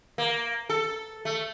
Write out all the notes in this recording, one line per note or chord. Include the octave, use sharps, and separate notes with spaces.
A#3
A4
A3